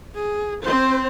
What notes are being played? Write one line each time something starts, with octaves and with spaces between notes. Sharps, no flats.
G#4
C4 C5